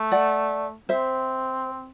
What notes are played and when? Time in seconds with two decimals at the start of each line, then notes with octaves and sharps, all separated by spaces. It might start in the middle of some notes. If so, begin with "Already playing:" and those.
Already playing: A3
0.12 D5 F#5
0.89 C4 C5 E5